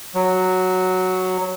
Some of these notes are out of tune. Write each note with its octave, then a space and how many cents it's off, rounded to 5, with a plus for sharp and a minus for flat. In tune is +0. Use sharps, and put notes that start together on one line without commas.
F#3 +0